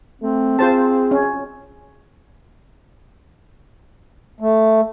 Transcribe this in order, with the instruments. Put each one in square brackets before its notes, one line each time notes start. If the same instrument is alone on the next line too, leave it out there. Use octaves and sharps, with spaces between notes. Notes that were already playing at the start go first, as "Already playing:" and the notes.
[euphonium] A3 [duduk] C4
[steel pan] F4 C5 A5 [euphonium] G#4
[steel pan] C#4
[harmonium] A3